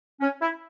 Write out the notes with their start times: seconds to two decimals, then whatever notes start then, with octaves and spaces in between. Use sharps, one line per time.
0.20 C#4
0.40 E4